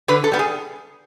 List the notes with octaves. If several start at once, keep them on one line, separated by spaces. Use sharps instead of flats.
D3 B4
A4
G3 B3
G#4